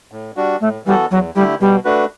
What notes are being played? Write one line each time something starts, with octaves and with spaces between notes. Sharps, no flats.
A2
G3 D4 F#4
A2 A3
E3 G3 B3 F#4 A4
E2 F#3
D3 G3 A3 E4 G4
B2 G3
A3 D4 F#4 B4